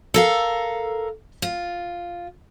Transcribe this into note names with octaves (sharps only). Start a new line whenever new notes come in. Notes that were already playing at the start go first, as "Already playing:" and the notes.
A4 A#4 F5
F4